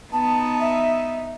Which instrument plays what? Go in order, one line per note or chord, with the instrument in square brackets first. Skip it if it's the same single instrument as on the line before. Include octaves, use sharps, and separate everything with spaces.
[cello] B3 D#4 [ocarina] A5
[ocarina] E5